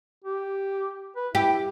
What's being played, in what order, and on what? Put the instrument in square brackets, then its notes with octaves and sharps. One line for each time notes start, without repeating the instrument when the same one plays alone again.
[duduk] G4
B4
[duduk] E4 [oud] G4